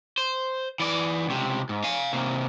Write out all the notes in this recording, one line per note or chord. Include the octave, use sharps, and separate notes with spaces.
C5
E3 D5
C#2 C3
G#2
F5 G#5
C3 A#3